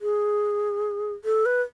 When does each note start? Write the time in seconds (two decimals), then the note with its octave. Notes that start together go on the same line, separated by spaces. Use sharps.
0.01 G#4
1.25 A4
1.46 B4